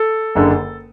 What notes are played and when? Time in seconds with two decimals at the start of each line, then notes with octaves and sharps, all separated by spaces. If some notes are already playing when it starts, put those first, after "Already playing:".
Already playing: A4
0.35 F#1 F#2 D3